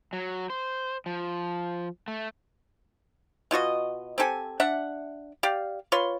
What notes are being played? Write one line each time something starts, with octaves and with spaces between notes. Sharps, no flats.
F#3
C5
F3
A3
B2 F4 F#4 D#5
C4 G4 A4 G#5
D4 E5 F#5
G4 D5 F5
F4 B4 C#5 C6